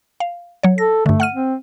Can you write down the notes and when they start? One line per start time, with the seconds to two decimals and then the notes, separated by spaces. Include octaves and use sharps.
0.20 F5
0.63 F#3 C#5
0.78 A4 A#6
1.06 G2 D3 A3
1.20 F#5 F6 D#7
1.34 C4